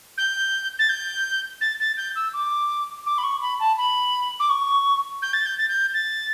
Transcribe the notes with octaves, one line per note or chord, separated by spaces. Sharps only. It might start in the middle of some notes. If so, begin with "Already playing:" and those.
G6
A6
G6
A6
A6
G6
E6
D6
D6
B5
C#6
B5
A5
B5
D6
C#6
G6
A6
G6
A6
G6
A6